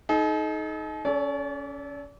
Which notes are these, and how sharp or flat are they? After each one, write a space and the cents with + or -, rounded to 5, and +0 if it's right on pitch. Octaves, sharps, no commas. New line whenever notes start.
D#4 +10 A4 -45
C#4 +15 A4 -15 D5 -35